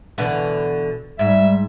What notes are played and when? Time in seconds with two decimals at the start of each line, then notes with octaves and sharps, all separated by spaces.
0.18 B2 D3 E3
1.19 G#2 G3 E5